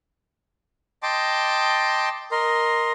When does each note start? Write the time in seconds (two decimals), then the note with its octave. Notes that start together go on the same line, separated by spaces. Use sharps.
1.03 D#5 G5 A5 C6 D6
2.31 A#4 D#5 C6